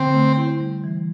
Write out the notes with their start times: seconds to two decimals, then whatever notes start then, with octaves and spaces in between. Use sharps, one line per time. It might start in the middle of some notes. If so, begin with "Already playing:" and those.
Already playing: D3 C4
0.14 A3
0.37 E4
0.61 G3
0.84 E3